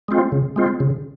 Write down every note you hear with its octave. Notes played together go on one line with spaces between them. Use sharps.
G#3 C4 F4
C#3
G#3 C4 F4
C#3